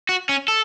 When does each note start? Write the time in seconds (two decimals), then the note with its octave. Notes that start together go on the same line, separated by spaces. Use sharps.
0.09 F#4
0.29 C#4
0.48 A4